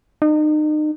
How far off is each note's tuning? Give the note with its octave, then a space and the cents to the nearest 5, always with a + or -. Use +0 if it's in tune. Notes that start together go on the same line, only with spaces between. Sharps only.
D#4 -35